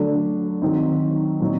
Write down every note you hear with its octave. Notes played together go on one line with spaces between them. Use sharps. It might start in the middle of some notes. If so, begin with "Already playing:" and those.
Already playing: D3 F#3 A3 D4
D#3 F#3 C4 D#4
A#2 F#3 C4 D#4